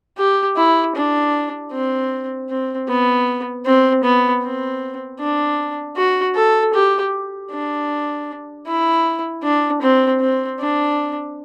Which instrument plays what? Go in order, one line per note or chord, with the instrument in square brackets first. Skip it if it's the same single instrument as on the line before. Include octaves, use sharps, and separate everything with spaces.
[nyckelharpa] G4
E4
D4
C4
C4
B3
C4
B3
C4
D4
F#4
A4
G4
D4
E4
D4
C4
C4
D4